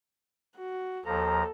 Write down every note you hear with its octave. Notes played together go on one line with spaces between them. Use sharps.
F#4
D#2 F3 A4 A#5